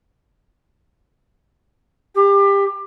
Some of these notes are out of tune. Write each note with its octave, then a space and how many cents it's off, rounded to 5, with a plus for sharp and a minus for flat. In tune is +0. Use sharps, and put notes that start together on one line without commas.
G4 +25